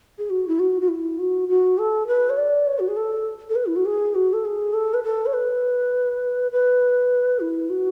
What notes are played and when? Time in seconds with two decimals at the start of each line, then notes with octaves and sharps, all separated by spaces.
0.18 G#4
0.30 F#4
0.48 E4
0.59 F#4
0.81 F#4
0.88 E4
1.19 F#4
1.49 F#4
1.78 A4
2.07 B4
2.30 C#5
2.37 D5
2.67 C#5
2.79 F#4
2.88 G#4
2.97 A4
3.49 A4
3.55 B4
3.66 E4
3.76 F#4
3.86 G#4
4.15 F#4
4.33 A4
4.45 G#4
4.73 A4
4.94 B4
5.04 A4
5.26 C#5
5.33 B4
6.52 B4
7.40 E4
7.70 F#4